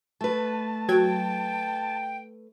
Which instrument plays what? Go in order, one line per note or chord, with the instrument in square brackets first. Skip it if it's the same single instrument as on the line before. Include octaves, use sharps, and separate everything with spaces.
[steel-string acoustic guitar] A3 B4 [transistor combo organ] A5
[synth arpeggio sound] F#3 G#6 [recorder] G5